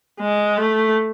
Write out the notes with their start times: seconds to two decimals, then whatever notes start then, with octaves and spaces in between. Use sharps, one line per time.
0.20 G#3
0.58 A3